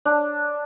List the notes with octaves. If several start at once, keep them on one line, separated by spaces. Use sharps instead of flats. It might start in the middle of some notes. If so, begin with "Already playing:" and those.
D4